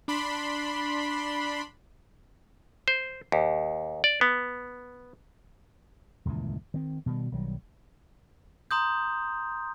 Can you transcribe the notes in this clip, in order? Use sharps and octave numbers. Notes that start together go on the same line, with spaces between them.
D4 B5 C6
C5
D#2
D5
B3
D#1 C#2 F#2 E3
D#3 C4
B2 D#3 E3 G3
B1 D#3 F#3 G3
A#5 C6 D#6 G6